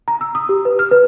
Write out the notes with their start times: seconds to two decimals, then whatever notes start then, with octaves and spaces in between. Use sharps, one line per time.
0.08 A#5
0.21 E6
0.35 D#6
0.49 G4
0.65 B4
0.79 F6
0.91 B4